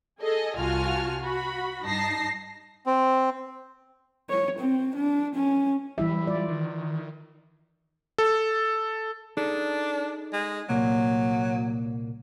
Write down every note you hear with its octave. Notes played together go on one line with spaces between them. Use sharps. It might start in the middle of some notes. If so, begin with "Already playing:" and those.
G#4 A4 D#5
C2 F4 F#4 G#5 A5 F6
F#4 B5
G2 D#4 A5 A#6 C7
C4
C#5
C4
D4
C#4
E3 G3 E4 E5
F4 D5
D#3
A4
D4 D#4 G#4 A4
G#3
C2 A#2 F#3 A#3